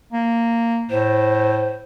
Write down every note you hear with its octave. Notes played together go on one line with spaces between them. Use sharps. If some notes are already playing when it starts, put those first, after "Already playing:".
A#3
A2 C5